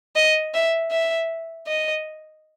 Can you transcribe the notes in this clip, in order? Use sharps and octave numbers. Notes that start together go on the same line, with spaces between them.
D#5
E5
E5
D#5